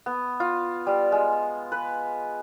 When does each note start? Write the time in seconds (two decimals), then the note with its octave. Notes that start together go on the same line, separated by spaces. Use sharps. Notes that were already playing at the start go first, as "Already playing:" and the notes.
0.06 B3
0.40 F4
0.87 G3
1.12 G#3
1.72 B4